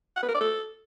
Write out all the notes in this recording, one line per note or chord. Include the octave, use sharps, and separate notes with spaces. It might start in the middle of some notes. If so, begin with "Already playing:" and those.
F#5
B4
A#4
D5
A4